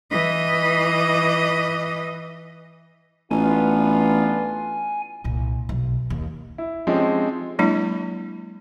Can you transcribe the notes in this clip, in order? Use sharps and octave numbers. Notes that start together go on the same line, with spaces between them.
E3 D#5
A1 B3 D4 F4 G#5
C2 A#2
B1
D#2
E4
F3 G#3 C4 C#4 D#4 G4
F#3 G#3 A#3 D4 E4